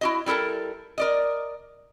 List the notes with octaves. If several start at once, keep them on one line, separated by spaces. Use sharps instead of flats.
E4 F#4 D#5
G3 E4 A4 A#4 A5
A#4 D5 D#5